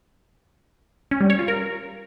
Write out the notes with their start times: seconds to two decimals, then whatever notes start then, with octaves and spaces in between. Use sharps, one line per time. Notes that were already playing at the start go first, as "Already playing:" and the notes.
1.11 C#4
1.21 G3
1.30 C#5
1.39 F4
1.48 A#4